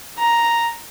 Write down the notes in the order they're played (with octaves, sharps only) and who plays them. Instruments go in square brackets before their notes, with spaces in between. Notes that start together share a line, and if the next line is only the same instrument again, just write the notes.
[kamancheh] A#5